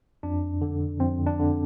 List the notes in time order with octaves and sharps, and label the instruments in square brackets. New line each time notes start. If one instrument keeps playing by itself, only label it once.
[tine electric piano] F2 D4
D3
F2 C4
D4
D3